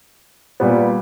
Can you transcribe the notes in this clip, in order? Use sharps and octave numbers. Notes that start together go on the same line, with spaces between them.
A#2 G3 B3